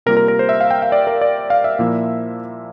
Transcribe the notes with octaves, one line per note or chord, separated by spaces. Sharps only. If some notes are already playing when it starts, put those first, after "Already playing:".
C3 G3 A#3 F4 A#4
A#4
A#4
C5
E5
F5
G5
F5
D5
A#4
D5
F5
E5
A#2 F3 A#3 E4